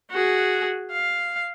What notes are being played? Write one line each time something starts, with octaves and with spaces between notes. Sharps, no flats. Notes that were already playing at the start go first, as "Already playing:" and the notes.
F#4 G#4
F5